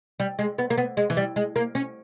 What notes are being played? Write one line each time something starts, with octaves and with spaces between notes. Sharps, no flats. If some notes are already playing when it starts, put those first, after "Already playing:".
G3
G#3
B3
A#3
B3
G#3
E3
G3
G#3
A#3
C#4